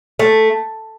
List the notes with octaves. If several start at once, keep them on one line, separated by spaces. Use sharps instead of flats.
A3